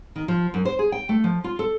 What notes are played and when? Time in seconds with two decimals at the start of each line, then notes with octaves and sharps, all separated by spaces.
0.16 D#3
0.28 F3
0.54 F#2
0.65 C5
0.79 G#4
0.92 G5
1.09 A3
1.24 F3
1.44 F4
1.59 A4